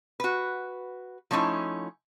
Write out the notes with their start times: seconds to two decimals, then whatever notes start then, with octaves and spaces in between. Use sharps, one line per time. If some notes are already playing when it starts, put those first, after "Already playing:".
0.20 F#4 B4
1.31 F3 A3 C#4 D#4 E4